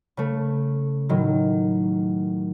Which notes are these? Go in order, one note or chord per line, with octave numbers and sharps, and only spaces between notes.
C#3 A3
A2 D#3 F#3